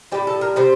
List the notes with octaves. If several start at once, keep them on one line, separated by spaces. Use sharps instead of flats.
A2 G3 G4
A4
A#4
C3 G3 C5